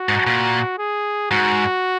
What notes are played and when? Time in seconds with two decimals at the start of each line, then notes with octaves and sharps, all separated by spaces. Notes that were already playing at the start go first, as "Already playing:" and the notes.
Already playing: F#4
0.09 G#2
0.27 A#2
0.78 G#4
1.31 G#2 F#4